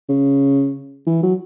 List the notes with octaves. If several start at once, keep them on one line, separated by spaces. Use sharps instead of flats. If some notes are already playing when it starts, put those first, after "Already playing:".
C#3
E3
F#3